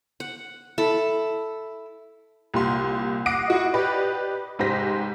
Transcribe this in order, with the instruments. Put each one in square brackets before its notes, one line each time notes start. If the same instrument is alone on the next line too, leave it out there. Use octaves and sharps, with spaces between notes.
[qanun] F#5
[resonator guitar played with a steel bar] E4 [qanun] A4
[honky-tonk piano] C2 A#2 G4 C6
F#5 D6 D#6 A#6 C7 D7
E4 F#4 D#5
G4 B4 D5 D#5
F1 G#2 G4 C5 A#6 B6